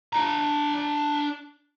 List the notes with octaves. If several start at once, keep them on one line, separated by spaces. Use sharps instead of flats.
D4 A#5